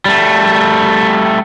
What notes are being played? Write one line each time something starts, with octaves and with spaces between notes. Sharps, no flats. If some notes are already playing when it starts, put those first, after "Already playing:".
G3 A3